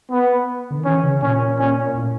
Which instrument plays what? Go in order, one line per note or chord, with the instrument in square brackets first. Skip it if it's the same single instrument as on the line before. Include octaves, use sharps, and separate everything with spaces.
[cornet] B3
[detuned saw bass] D3
D#3
[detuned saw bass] E3 [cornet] C#4
[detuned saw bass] C#3
[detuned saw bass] A#2 [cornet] C#4
[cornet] C#4
[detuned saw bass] A2